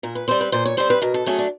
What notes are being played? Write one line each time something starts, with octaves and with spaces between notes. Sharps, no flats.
A#2 A#4
B4
G3 C4 C5
B4
A#2 C5
C#5
G3 C4 C5
B4
B2 A#4
A4
F#3 A3 C#4 G#4
D4